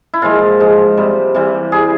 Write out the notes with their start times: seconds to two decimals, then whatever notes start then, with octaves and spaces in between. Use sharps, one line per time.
0.14 E4
0.22 A#2 F3 G#3 F4
0.60 G#2 F3 G#3
0.97 C3 G3
1.34 C3 E3 G3
1.72 G3 G#4